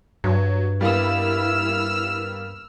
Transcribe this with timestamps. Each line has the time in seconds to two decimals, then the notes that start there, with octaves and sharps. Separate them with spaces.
0.24 G2 F#3
0.81 G3 A#3 B3 E4 E6 F6